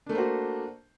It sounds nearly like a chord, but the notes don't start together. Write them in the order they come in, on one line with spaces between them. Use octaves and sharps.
D4 A3 A#3 C5 F#4